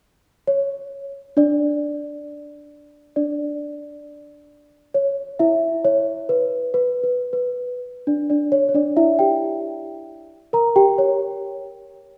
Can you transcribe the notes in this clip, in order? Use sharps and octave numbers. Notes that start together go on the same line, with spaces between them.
C#5
D4 D5
D4 D5
C#5
E4 E5
C#5
B4
B4
B4
B4
D4 D5
D4 D5
C#5
C#5
D4 D5
E4 E5
G4 G5
A#4 A#5
G4 G5
C#5